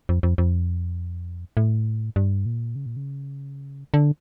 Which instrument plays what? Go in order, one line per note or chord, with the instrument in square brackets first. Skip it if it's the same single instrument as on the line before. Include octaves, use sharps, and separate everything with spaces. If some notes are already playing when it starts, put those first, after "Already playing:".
[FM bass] F2
F2
F2
A2
G2
A#2
C#3
A#2
C#3
D3